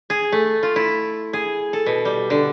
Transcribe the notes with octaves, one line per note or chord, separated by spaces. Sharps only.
G#4
A3
F4
E4
G#4
A4
B2
G3
D3